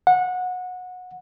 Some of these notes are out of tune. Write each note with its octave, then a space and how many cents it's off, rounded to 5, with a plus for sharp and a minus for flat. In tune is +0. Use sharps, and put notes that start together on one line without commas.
F#5 -20